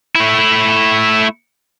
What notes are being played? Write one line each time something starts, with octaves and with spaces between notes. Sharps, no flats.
A3 E4